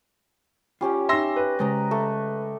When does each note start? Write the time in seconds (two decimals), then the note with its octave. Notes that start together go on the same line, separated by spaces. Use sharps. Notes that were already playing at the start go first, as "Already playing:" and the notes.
0.81 G3 C#4 F4 G4
1.09 D#4 E5 C6 E6 A#6
1.36 B4
1.59 C#3 G#3 C5 D5 D#5 A#5
1.91 A3